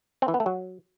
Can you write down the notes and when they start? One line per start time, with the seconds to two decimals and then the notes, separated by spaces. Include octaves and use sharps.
0.22 C4
0.28 E3
0.34 B3
0.40 A3
0.46 F#3